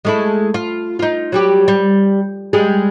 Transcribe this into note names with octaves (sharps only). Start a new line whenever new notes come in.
G#3 A3 E4
F4
D#4 F4
F#3 G3 G4
G3
G3 G#3 G#4